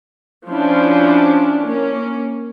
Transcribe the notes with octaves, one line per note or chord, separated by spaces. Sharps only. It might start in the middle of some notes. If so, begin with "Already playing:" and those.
F3 C#4 D4 E4
A#3 C#4